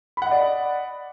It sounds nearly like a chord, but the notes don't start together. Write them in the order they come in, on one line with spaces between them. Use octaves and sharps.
B5 F#5 D#5 D5